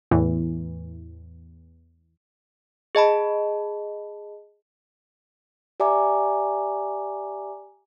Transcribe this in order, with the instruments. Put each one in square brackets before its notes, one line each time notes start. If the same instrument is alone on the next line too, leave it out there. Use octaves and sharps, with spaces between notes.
[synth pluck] E2 A2 E3
[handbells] G#4 D#5 A5 B5
[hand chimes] G4 D5 E5 G#5 A#5 D6